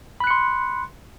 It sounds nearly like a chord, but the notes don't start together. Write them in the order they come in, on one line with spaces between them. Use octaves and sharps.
B5 F#6 C#7 C6